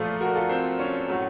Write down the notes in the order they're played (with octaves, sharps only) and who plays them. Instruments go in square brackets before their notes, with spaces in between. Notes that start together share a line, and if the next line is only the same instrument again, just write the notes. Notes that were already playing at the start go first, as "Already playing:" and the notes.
Already playing: [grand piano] A#2 F3 A3 F4 A4
F#4 A#4
F4 A4
C4
C#4
A2 F#3 A3